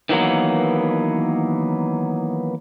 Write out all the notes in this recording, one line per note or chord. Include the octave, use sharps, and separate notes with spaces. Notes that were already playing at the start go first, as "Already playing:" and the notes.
D#3 E3 F#3 A#3 B3